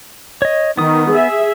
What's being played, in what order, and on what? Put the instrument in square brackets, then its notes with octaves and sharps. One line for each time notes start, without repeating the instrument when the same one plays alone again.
[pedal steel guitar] C#5 D#5
[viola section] D#3 [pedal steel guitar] B3 D#6
[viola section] G#4 E5